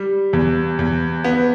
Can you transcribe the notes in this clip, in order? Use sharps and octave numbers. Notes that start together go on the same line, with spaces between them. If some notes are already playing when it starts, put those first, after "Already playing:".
Already playing: G3
E2
E2
B3